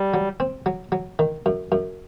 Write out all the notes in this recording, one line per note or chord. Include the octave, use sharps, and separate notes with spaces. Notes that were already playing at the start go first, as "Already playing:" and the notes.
Already playing: G3
F#3
C4
F#3
F#3
D#3
F#2
F#2